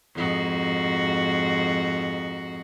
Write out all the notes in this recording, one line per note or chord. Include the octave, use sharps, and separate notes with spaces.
F2 G#2 F#4